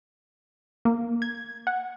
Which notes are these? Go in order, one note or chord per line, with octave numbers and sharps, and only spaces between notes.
A#3
G#6
F#5